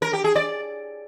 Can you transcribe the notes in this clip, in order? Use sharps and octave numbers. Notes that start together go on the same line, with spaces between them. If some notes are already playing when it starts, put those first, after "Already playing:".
A#4
G4
G#4
D5